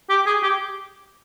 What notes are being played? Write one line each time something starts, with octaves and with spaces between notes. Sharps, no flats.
G4
G#4
G4